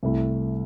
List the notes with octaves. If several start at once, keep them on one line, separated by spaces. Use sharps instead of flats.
C2 C3 A3 E4